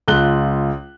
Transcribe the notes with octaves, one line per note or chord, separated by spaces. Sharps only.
C#2 F4 F#6 G7